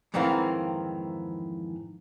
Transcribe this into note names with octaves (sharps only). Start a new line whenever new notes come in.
F2 G#2 D#3 E3 A#3 C4